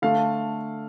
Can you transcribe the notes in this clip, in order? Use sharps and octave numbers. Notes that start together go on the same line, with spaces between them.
D3 A3 F5